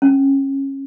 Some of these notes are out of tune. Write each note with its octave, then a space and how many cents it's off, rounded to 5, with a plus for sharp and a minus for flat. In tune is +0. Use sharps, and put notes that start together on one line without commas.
C#4 -20